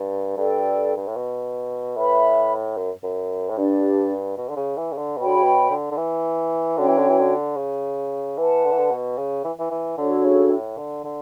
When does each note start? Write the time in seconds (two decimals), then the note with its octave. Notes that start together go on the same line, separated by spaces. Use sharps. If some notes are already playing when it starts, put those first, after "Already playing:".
Already playing: G2
0.37 G2 A4 D5 G5
0.97 G2
1.07 A2
1.16 B2
1.97 A2 B4 E5 B5
2.77 F#2
3.03 F#2
3.50 A2
3.57 G2 D4 G4 D5
4.37 B2
4.49 D3
4.56 C#3
4.77 E3
4.92 C#3
4.98 D3
5.17 B2 F#4 C#5 G5 B5
5.27 D3
5.36 C#3
5.43 B2
5.70 D3
5.91 D3
5.97 E3
6.77 D3 C#4 F#4 C#5 G5
6.88 E3
6.97 D3
7.09 E3
7.20 D3
7.57 C#3
8.37 E3 B4 F#5 A5
8.65 D3
8.71 E3
8.78 D3
8.91 B2
9.18 C#3
9.44 E3
9.59 E3
9.71 E3
9.98 D3 D4 F#4 A4 C#5
10.25 C#3
10.51 A2
10.77 D3
11.04 D3